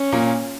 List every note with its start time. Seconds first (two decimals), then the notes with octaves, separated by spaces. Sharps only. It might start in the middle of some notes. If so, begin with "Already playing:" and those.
Already playing: C#4
0.12 A#2 A#3